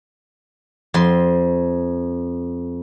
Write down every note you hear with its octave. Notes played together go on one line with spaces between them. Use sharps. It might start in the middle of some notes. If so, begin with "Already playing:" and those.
F2 C6